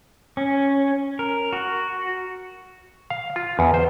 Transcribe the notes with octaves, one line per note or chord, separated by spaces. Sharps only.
C#4
A#4
F#4
F5
F4
E2
C5